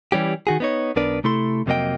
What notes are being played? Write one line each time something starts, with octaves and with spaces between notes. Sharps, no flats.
E3 G3 C#4 G4
D#3 F#4 G#4
B3 D#4 C#5
B1 B3 D4 A#4 B4 D5
C3 A3 E4 A4 C6
F2 C3 F#3 A#3 D#5 G5